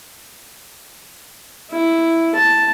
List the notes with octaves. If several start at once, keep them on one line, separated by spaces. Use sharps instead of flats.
E4
A5